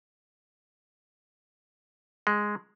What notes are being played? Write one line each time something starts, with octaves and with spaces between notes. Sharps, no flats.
G#3